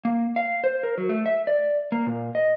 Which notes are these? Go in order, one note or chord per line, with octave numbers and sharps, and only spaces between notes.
A#3
F5
C5
A#4
F#3
A3
E5
D5
A#3
A#2
D#5